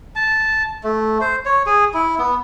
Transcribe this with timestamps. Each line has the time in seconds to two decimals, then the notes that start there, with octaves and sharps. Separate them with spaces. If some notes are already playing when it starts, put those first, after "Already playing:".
0.16 A5
0.84 A3
1.21 C5
1.46 C#5
1.66 G#4
1.94 E4
2.19 B3